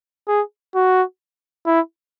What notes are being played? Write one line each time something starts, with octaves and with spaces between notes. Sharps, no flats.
G#4
F#4
E4